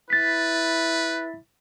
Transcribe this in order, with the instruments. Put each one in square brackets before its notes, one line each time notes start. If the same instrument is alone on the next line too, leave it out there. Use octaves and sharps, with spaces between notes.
[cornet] E4 [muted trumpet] B4 [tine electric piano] A6 B6